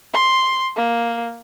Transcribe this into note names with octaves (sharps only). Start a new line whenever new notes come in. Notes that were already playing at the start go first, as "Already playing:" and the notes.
C6
A#3